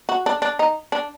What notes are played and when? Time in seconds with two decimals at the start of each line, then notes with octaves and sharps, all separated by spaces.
0.09 F#4
0.26 D4
0.42 D4
0.59 D#4
0.92 D4